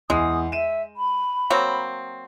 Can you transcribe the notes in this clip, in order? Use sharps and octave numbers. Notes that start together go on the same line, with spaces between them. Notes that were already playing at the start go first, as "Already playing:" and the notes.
E2 G#3 D#6
E5 D#7 E7
B5
F#3 A#3 C4